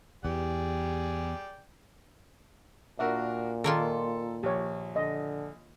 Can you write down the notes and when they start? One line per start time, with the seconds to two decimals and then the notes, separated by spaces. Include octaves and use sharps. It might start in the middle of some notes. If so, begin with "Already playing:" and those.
0.25 E2 G4 G#4 D5 G5
2.99 A#2 D4 F#4 A#4 E5
3.64 D#3 A#3 F4 A4
4.43 A#1 G4 C#5
4.96 D3 D#5